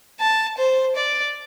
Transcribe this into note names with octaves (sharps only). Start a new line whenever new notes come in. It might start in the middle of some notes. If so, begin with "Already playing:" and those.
A5
C5
D5